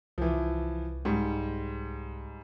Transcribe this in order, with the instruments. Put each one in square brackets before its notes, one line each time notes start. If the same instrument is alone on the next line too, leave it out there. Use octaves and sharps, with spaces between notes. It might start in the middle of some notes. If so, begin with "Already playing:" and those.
[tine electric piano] C2 [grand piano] E3 F3
[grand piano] G#2 G3